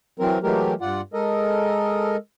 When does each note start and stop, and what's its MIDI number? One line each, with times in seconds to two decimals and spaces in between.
0.19 0.39 52
0.19 0.39 54
0.19 0.39 60
0.19 0.39 70
0.43 0.74 52
0.43 0.74 54
0.43 0.74 56
0.43 0.74 57
0.43 0.74 67
0.43 0.74 70
0.81 1.01 43
0.81 1.01 65
0.81 1.01 74
0.81 1.01 78
1.14 2.16 56
1.14 2.16 69
1.14 2.16 70
1.14 2.16 75